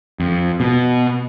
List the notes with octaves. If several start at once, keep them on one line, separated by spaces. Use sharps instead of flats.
F2
B2